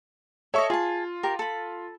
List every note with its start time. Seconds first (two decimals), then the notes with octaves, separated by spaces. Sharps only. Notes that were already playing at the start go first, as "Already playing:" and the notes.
0.54 A4 C#5 D#5 E5 C#6
0.70 F4 G#4 A5
1.23 G4 A#4
1.39 A4 B5